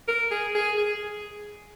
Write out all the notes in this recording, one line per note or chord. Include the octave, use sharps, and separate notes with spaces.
A#4
G#4
G#4
G#4